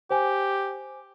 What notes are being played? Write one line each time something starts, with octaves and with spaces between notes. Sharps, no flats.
G4 C5 G#5